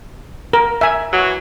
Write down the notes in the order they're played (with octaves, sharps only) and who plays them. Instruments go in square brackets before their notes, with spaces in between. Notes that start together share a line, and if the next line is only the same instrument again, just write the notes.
[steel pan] A#4
E5 G#5
[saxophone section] E3 F#3